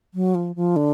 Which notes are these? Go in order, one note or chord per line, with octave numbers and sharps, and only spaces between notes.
F#3
F3
F3
D3